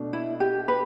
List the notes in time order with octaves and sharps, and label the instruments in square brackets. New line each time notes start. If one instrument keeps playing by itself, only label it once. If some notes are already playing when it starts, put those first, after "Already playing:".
Already playing: [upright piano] B2 A3 D4
[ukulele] E4
G4
B4